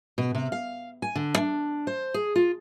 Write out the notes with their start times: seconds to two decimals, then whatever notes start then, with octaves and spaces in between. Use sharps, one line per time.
0.18 B2
0.35 C3
0.52 F5
1.02 G#5
1.15 D3
1.37 D4
1.87 C5
2.14 G#4
2.36 F4